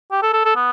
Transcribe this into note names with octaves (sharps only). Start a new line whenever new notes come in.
G4
A4
A4
A4
B3